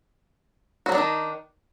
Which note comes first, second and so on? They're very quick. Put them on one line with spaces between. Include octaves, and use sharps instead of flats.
F#4 F#3 D4 D#4 D#3